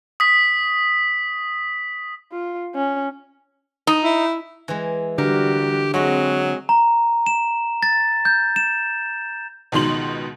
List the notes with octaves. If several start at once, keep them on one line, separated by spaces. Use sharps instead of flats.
D#6 B6
F4
C#4
D#4
E4
E3 G#3
D3 G3 F#4 G4 A#4
F#3 G#3 C4 F#4 G#4 E5
A#5
E7
A6
G6
E7
C#2 B2 D#3 C6 F#7